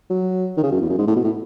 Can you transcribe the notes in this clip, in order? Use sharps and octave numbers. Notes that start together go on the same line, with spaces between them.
F#3
D#3
C#3
F#2
E2
F#2
G#2
A2
B2
A2